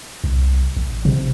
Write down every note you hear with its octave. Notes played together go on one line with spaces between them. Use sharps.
C2
A1
C3